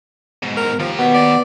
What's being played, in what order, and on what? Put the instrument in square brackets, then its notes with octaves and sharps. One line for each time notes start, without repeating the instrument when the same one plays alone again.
[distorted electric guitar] G#2 B2
[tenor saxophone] A#4
[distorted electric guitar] D#2 G4 [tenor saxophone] F3
[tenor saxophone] B2 [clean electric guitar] B3
[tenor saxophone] D5